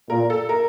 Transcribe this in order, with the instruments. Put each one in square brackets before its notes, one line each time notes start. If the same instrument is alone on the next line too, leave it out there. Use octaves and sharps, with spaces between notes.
[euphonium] A#2 [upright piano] A#4
[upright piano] A4
A#4